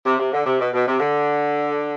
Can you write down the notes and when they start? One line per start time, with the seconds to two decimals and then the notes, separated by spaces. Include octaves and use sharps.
0.06 C3
0.19 C3
0.33 D3
0.46 C3
0.60 B2
0.74 B2
0.87 C3
1.00 D3